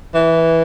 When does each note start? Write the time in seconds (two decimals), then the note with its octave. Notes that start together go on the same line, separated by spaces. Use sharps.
0.14 E3